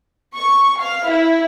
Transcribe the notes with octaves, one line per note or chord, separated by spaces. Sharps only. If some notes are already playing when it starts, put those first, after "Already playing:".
C#6
F5
E4